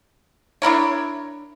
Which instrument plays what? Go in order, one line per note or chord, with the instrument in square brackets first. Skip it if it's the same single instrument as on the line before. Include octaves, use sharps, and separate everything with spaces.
[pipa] D4 E4 A#4 C#5